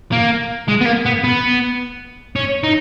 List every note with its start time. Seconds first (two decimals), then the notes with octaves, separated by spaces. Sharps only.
0.12 A#3
0.68 G#3
0.81 B3
0.86 A#3
1.06 B3
1.24 B3
2.36 C#4
2.63 D#4